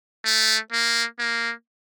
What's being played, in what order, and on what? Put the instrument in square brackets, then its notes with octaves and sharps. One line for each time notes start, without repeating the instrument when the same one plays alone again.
[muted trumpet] A3
A#3
A#3